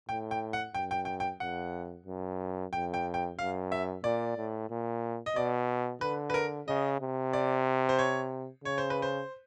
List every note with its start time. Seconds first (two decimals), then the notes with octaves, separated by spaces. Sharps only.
0.09 A2 G5
0.31 G5
0.53 F#5
0.74 F#2 G5
0.91 G5
1.05 G5
1.20 G5
1.40 F2 F#5
2.06 F#2
2.72 F2 G5
2.94 G5
3.14 G5
3.38 F#2 F5
3.72 E5
4.04 A#2 D5
4.37 A2
4.70 A#2
5.26 D#5
5.36 B2 D5
6.01 D3 B4
6.30 B4
6.34 A#4
6.67 C#3 D#5
7.00 C3
7.33 D5
7.89 C5
7.99 C#5
8.64 C#3 C#5
8.78 C5
8.90 B4
9.02 C5